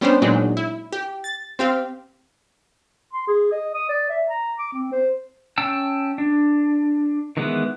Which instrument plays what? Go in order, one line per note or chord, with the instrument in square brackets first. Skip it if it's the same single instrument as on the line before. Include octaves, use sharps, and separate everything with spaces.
[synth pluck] G3 B3 C#4 D4 G4 C5
A#2 F#3 G#3 D4 D#4
E4
G4
A6
C4 G4 F5
[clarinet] C6
G#4
D#5
D#6
D5
E5
A#5
D6
C4
C5
[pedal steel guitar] C#4 G5 A5 E6
D4
D#3 E3 G#3 B3